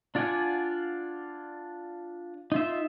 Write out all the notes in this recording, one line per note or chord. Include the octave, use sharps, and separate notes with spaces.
D4 F4 D5 F#5 G#5
D#4 F4 E5